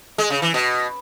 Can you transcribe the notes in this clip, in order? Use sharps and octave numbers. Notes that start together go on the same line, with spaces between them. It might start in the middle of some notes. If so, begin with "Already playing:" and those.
G#3
C#3
E3
B2